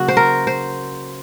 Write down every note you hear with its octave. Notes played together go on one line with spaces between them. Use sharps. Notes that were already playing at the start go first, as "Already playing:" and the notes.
Already playing: C#3 F#3 A#3 F#4
C5
A#4
C5